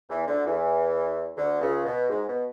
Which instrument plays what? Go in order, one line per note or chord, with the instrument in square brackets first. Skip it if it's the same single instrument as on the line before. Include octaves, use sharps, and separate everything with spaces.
[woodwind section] E2 E3
D2 D3
E2 E3
D2 D3
C#2 C#3
B2
G#2
B2